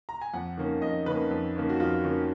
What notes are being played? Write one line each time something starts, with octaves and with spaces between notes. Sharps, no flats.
A#5
G#5
F2 F#5
D#3 A#3 C#4
F2 D#5
D#3 A#3 C#4 B4
F2
D#3 A#3 C#4
F#4
F2 F4
D#3 A#3 C#4